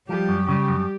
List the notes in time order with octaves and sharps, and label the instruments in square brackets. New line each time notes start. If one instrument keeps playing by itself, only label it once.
[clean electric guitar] F3 [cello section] G3 G4
[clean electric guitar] F#2
[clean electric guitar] C#3 [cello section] G3 G4
[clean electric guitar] F#2